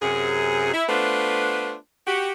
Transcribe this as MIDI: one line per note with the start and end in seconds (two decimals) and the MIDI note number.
0.02 0.73 42
0.02 0.73 48
0.02 0.73 68
0.74 0.84 64
0.89 1.75 57
0.89 1.75 59
0.89 1.75 62
0.89 1.75 65
0.89 1.75 71
0.89 1.75 72
2.07 2.32 66
2.07 2.32 67